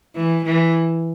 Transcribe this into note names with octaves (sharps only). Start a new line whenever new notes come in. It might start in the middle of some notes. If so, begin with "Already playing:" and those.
E3
E3